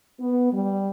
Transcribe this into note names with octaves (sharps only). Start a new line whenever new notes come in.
B3
G3